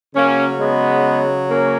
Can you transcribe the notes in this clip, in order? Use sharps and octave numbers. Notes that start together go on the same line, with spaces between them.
C#3 F#3 A#3 C#4
G#3 B3
A#3 C#4